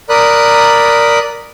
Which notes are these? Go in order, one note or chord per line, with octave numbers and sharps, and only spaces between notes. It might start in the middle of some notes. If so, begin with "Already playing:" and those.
A#4 D5 B5 D#6 F#6